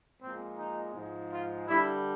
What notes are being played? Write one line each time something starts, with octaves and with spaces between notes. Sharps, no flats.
A#2 F3 G#3 C4
D#4
G#2 F3 G#3
F4
G2 D3 G3 E4